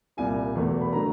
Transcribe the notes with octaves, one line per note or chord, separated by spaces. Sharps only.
C2 A#2 G3 G#5
E1 E2 B2 F#3 A3
B5
D3 F#3 A3 A#5